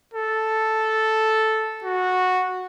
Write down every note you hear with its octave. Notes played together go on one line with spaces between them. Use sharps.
A4
F#4